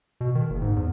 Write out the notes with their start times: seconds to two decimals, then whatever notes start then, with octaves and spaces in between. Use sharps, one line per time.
0.21 B2
0.35 D#3
0.50 F#1
0.62 G#2
0.76 E2